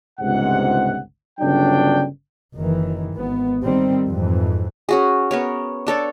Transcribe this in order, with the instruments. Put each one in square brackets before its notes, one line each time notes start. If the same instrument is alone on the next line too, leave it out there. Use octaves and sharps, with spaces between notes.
[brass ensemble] G1 C#2 G#2 C3 F#5
G1 C#3 F#3 D4 G5
[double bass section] F#1 D#3 E3
G#1 B3
D#3 G3 C4
F2 G#2 E3
[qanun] C#4 F#4 G#4
B3 A#4 C#5
D4 A4 C#5 D5